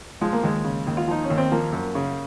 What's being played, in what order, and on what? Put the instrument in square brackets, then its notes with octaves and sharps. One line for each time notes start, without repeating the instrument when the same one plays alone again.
[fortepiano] F3 G#3
A#3
D#2 G#3
C#3
D#2
F4
F3 D#4
C#4
D#2
C4
F3 A#3
F#2
C#3